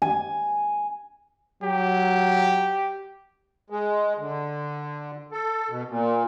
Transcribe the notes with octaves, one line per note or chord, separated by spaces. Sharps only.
G#5
F#3 G4
G#3
D3
A4
B2
A#2